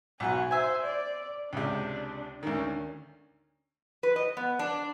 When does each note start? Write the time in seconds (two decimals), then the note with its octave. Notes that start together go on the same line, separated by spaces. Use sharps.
0.20 B1 F#4 G#5
0.51 C5 E5 G#5
0.83 D5
1.53 C#2 C3 D4
2.43 D2 D#3 C#4
4.03 B4
4.16 D#5
4.37 B3
4.59 D4